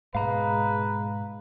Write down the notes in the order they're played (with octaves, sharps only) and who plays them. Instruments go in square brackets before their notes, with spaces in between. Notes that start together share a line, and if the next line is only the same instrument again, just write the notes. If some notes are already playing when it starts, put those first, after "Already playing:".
[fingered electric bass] G#2 [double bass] B2 G#3 [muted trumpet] B4 [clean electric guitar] F5 A#5